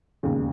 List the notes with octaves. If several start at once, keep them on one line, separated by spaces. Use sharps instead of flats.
E1 D#2 C#3